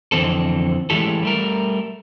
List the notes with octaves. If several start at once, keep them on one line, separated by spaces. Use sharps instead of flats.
F2 D3 E3 C4 A4
E3 G#3 A3 E4 G4 A4
G3 A3 A#4